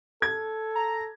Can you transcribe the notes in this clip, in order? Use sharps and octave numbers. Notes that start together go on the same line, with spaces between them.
A4 G#6
A#5